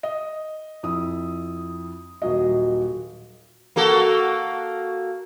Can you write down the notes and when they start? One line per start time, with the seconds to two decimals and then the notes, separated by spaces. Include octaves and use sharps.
0.03 D#5
0.83 F2 E4 D#6
2.22 D#1 F#3 D#5
3.76 A#3 F#4 A4